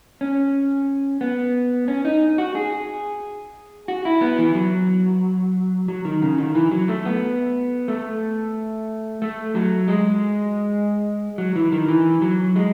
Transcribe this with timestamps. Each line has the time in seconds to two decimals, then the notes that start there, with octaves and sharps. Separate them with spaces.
0.21 C#4
1.21 B3
1.88 C#4
2.05 D#4
2.38 F#4
2.55 G#4
3.88 F#4
4.05 E4
4.21 B3
4.38 E3
4.55 F#3
5.88 F#3
6.05 D#3
6.22 C#3
6.38 D#3
6.55 E3
6.71 F#3
6.88 A3
7.05 B3
7.88 A3
9.22 A3
9.55 F#3
9.88 G#3
11.38 F#3
11.56 E3
11.72 D#3
11.89 E3
12.22 F#3
12.56 G#3